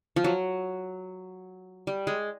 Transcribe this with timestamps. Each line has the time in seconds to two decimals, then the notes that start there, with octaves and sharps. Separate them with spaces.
0.16 F3
0.24 F#3
1.87 G3
2.07 G#3